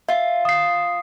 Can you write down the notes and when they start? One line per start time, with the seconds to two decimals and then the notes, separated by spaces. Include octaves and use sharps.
0.09 F4 E5
0.45 D#6 C7